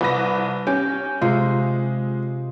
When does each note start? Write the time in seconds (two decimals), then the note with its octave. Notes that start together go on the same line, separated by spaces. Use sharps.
0.01 C2 B4 A#6
0.67 C#4 G4
1.21 C3 G#3 F4